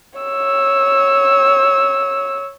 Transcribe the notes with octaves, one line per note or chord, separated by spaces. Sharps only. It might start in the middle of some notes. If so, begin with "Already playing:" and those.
C#5 E6